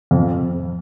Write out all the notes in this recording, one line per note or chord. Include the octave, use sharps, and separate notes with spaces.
F2